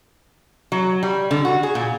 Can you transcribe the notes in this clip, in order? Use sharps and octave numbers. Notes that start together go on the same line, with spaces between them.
F#3
G3
D3
F#4
G#4
A#2